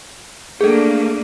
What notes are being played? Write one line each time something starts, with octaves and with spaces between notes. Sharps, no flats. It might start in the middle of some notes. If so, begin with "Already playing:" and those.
A3 A#3 D4 G#4 A4